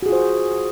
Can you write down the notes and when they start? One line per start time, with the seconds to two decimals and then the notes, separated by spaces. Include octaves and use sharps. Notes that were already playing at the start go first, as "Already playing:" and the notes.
0.03 F#4
0.06 G#4
0.09 F4
0.12 C5